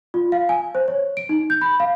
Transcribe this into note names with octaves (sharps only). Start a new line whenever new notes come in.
F4
F5
G#5
C5
C#5
D7
D#4
G6
B5
F5